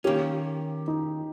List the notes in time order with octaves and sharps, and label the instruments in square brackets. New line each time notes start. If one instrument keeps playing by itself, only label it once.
[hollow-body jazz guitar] D#3 A#3 C#4 [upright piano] G4
[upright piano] D#4